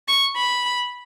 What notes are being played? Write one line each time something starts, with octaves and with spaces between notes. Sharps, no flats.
C#6
B5